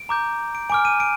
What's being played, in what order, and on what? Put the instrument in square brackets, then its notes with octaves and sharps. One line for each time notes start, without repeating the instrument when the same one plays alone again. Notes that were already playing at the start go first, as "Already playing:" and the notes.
Already playing: [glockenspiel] D7
A#5 D6 G6
D7
G#5 D6 F6 D7
D#7
D7